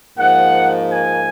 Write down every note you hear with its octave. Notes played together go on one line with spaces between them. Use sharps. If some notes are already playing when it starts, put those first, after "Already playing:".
G#2 F3 A#3 F#5
G#5